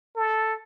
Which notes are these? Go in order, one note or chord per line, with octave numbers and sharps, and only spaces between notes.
A4